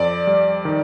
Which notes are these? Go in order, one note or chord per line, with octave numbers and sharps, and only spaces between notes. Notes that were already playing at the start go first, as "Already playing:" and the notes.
Already playing: F2 D5
G3
D#3